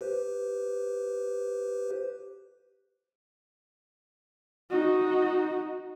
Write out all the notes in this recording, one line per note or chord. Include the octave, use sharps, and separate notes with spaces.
G4 B4 C5
D#4 F#4